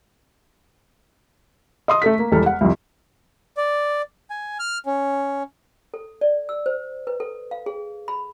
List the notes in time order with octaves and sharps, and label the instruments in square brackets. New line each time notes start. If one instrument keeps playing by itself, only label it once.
[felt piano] D#5 C6 D#6
A3 A4 B6
A#3
E1 E2 G3 A4 F6
F#5
C2 F2
[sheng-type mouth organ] D5
G#5
F6
C#4
[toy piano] A4
D5
E6
C5
B4
A4
F5
G#4
B5